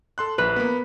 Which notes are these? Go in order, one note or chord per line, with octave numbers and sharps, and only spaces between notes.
A4 C6 F#6
A#1 B4
A#3 B3